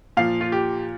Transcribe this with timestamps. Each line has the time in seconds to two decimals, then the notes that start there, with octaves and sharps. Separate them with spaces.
0.17 A#2 F3 F5
0.41 F4
0.52 G4